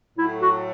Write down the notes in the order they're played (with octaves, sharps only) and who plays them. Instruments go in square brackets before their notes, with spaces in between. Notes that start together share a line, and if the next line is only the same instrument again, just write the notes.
[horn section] A2 F#3 A3 [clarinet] E4
[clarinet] F#4